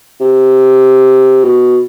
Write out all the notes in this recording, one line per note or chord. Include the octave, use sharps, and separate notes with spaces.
C3
B2